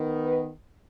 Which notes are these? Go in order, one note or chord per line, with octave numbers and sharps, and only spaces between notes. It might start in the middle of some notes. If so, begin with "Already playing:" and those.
Already playing: D#3 B3
B4